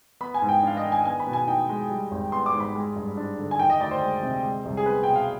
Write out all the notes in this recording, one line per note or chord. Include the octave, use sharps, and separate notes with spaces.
B3 B5
G#5
G#2
G5
D4 F5
D#5
D#3
G#5
B3 G#5
B5
B2
G#5
D#4 G5
G#3
G3
G#1
B3 C6
D6
G#2
B5
G#3
G2
D4
D3
G#5
D#3 G5
D#5
D2 D5
C5
G#3
C3
G#3
C2
G#4
B3 B4
B2 G5
F5